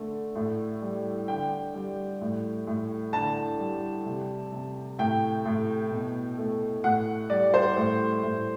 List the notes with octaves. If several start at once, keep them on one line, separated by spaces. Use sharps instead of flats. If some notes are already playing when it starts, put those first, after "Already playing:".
Already playing: D3 A3
A2
G3
D3 G5
G3
A2
A2
D3 A5
G3
C3
C3
A2 G5
A2
B2
A3
A2 F#5
G3 D5
C5
A2
A2